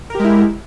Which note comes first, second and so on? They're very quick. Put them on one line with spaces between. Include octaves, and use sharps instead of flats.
A#4 G4 G#3 E4